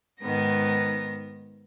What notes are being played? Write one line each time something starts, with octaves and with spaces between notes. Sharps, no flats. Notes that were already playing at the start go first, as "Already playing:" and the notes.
G#2 D#3 B3 A#6